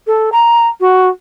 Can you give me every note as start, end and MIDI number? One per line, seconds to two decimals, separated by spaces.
0.07 0.30 69
0.32 0.67 82
0.80 1.09 66